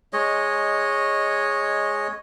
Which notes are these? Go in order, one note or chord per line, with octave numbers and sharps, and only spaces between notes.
G#3 C#5 D#5